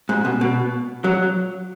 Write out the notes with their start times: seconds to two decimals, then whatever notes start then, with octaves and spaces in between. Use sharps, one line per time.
0.09 G#2
0.25 B2
0.41 B2
1.04 F#3